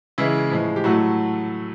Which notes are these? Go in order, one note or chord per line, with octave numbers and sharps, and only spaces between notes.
C#3 E3 G#3 E4
A2 F3 G#3
G4
A2 F#3 A3 F#4